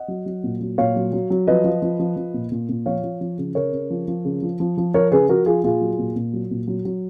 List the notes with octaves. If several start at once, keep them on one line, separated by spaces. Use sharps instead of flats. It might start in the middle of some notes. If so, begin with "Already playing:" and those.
Already playing: D#5 F#5
F#3
F#3
A#2
F#3
A#2 C#5 F5
F#3
F#3
F#3
F3 B4 D#5
F3
F3
F3
F3
A#2
A#2
A#2
F3 C#5 F5
F3
F3
C#3
C#3 A#4 C#5
C#3
F3
F3
C#3
F3
F3
F3
F3 A#4 C#5
C#3 G#4 B4
F3 F#4 A#4
F3 F4 G#4
A#2 F4 G#4
F#3
A#2
A#2
F#3
A#2
F#3
F#3